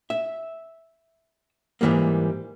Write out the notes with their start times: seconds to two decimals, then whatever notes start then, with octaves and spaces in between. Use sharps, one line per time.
0.10 E5
1.81 G#2 D3 E3 G3 A#3